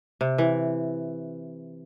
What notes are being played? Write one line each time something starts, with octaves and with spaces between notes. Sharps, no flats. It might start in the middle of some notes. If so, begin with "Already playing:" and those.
C3
E3